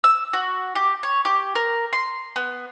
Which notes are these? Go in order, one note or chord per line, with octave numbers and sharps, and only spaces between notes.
E6
F#4
G4
C#5
G4
A#4
C6
B3